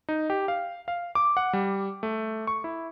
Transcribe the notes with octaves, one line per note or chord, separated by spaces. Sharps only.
D#4
G4
F5
F5
D6
F#5
G3
A3
C#6
E4